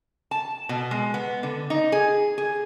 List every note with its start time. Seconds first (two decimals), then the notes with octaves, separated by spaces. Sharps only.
0.31 A5
0.69 B2
0.91 G#3
1.14 B3
1.43 D3
1.70 D#4
1.92 G#4
2.38 G#4